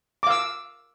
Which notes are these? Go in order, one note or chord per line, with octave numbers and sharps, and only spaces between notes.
F5 D6 E6